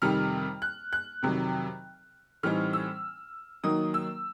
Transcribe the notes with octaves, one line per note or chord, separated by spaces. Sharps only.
F2 C3 D#3 G3 F6
F#6
F#6
F2 C3 D#3 F#3
A2 E3 G3 C4 D#4 F6
E6
D#3 F#3 A#3 D#4 D#6
E6